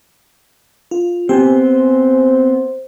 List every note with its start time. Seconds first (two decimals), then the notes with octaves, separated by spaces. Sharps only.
0.91 F4
1.29 B3 C4 G4 C5 G#5